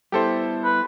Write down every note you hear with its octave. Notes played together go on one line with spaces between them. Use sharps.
G3 B3 E4 G4 A4 C5
B4